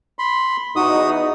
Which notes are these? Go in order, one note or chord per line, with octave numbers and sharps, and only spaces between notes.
B5 C6
E2 D#4 F#4 D#6